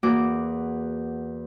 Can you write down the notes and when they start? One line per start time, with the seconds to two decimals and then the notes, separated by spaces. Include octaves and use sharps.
0.03 E2 A#3 F#4 D6